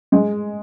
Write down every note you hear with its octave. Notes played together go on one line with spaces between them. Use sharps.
G#3